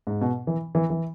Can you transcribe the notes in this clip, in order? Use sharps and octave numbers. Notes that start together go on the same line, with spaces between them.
G#2
B2
E3
E3
E3